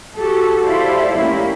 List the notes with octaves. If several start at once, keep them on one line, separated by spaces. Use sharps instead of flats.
F#4 G4 A4
E4 G4 A4 C5 D5 F5
A#3 C#4 E4 G4